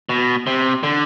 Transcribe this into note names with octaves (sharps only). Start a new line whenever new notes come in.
B2
C3
D3